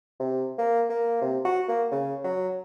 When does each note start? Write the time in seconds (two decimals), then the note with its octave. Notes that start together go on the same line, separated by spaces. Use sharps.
0.20 C3
0.58 A#3
0.90 A#3
1.22 C3
1.45 F#4
1.69 A#3
1.92 C#3
2.24 F#3